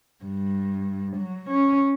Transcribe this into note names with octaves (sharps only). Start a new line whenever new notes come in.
G2
F#3
C#4